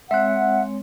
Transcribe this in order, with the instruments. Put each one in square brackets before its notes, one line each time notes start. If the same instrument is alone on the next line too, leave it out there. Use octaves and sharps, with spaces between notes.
[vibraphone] G#3 C4 C#5 [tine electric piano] E5 F#6 [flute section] F#5